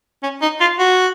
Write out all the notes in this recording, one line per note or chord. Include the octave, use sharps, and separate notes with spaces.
C#4
D#4
F4
F#4